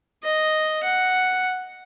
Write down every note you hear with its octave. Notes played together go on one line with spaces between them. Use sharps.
D#5
F#5